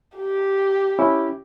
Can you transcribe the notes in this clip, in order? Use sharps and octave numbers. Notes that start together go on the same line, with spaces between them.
G4
C#4 E4